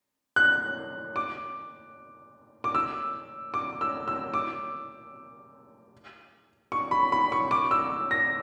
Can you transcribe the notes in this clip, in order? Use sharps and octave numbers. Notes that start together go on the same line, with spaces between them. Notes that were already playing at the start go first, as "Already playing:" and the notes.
F#6
D6
D6
E6
D6
E6
E6
D6
C#6
B5
B5
C#6
D6
E6
A#6